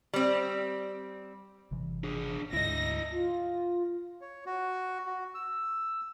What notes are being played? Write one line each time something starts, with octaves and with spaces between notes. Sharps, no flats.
G3 C4
G1 C3 E3
D4 G#4
D2 G#2 E4 D#5 A#6
F4
C#5
F#4
F#4
E6